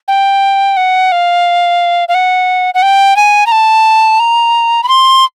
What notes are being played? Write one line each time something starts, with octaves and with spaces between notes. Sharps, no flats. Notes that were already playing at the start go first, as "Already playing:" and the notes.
G5
F#5
F5
F5
F#5
F#5
G5
G#5
A#5
A5
A#5
B5
C6